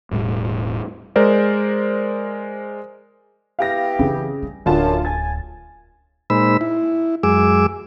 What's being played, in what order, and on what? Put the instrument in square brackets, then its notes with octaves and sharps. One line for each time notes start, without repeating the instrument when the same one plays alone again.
[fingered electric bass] E1 A2 G3
[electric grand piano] G#3 A#4 C5 D5
[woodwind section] B3 E4 G4 [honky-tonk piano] F5 A#6
[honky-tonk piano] C#3 [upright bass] E3
[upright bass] G3
[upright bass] D1 A2 [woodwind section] F#2 [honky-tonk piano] D3 F4 A5
[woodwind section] G#5 [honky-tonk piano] A6
[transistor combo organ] A#2 G#3 D#4 C5 B5 E6
E4
F#2 G#3 G#4 D6 E6